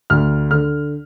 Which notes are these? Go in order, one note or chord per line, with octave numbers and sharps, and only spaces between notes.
D2 F6
D3 F6